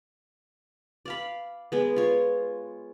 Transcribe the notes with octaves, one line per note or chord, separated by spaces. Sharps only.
D5 F5 B5
G#3 B3
F4 C#5